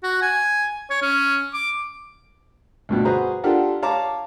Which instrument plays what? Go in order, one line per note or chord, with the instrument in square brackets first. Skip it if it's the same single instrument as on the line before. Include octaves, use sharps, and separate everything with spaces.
[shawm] F#4
G#5
C#5
C#4
D6
[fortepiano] D2 G2 B2
F#4 G#4 B4 C5 A#5
D4 F4 G4 A4 A#4 F#5
C#5 F5 A5 A#5 D6